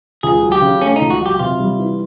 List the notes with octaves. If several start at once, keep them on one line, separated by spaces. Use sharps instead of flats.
C#2 G#4
F#3
G4
C#3
A3 C#4
D#4
C#2
F#4
F#3 G4
C3 F4
G3
E3